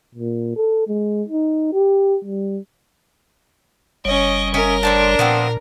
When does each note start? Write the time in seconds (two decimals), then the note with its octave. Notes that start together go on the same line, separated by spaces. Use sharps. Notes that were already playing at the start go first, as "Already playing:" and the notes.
0.15 A#2
0.56 A4
0.88 G#3
1.29 D#4
1.73 G4
2.25 G3
4.05 F#1 G3 C#4 C#5 D#5
4.54 C#4 A#4 D#5 E5
4.83 A2 D4 C5 A5
5.19 A#2 F3 B3 C4